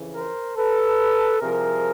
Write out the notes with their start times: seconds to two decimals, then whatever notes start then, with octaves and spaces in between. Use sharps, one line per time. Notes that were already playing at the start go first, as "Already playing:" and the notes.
Already playing: F2 C#3 E3
0.15 A#4 C5
0.57 A4 B4
1.39 C2 C3 F3 G#4 A#4